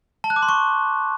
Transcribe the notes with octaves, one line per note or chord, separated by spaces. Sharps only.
A5
F#6
D6
C6
C#6